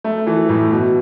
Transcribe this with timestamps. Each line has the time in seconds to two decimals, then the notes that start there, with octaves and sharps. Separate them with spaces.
0.04 A3
0.27 E3
0.49 A2
0.71 B2